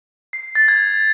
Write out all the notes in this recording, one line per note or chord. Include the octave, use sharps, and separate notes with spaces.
C7
A6
G#6